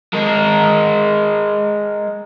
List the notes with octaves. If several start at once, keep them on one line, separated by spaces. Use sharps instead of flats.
G#3 A#4